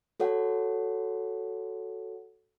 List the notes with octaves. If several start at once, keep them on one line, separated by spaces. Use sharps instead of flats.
F#4 A4 C#5 F#5